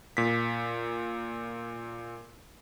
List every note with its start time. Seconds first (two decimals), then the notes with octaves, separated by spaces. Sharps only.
0.17 A#2 B6